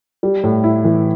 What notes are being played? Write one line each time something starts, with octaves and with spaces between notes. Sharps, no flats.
G3
A2
E4
E3